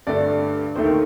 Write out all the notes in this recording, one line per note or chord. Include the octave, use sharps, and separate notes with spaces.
G2 D3 A3 D5
D#2 D#3 A3 C5
A#4